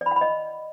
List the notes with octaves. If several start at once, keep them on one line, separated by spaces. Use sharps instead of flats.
D5
B5
F#5
B5
D#5